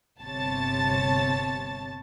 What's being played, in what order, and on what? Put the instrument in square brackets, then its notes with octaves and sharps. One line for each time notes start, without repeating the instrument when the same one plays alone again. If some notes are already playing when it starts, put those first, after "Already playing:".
[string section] G1 C3 C#5 A5 A6